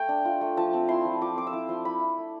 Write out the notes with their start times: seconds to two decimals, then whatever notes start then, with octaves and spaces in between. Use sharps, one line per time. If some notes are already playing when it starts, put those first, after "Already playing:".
Already playing: A3 G5 A5
0.09 D4
0.25 F4
0.41 A3
0.57 F3 A5
0.73 C4
0.89 E4 C6
1.05 F3
1.21 F3 D6
1.37 C4 D6
1.47 E6
1.53 E4 D6
1.69 F3 C6
1.85 E4 B5
2.01 E4
2.18 A3